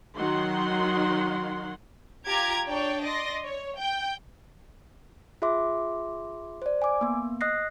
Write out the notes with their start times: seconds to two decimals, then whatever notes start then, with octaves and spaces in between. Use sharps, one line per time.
0.16 D#3 F#3 D#4 F#5 C6
2.27 F4 G4 A#5 D6 G#6
2.66 D4 C#5 D5 G5
3.03 D5 D#5 C6 A#6
3.45 C#5
3.78 G5 G6
5.42 F4 G#4 E5 C6 D6
6.62 C5 D5
6.82 G#5 D6
7.01 A#3 B3
7.41 D#5 D#6 F#6 A#6 C7